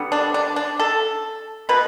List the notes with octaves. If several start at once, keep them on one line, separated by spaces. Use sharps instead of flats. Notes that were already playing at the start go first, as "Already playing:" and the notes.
Already playing: D3 G3 B3
D4
D4
D4
A4
B2 B4